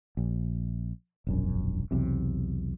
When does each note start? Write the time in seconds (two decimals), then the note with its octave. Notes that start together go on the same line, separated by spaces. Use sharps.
0.17 A#1
1.27 E1 A#1 F#2
1.91 B1 E2 C3